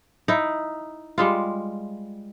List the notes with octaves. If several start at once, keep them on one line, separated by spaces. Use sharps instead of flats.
D#4 E4
G3 G#3 F4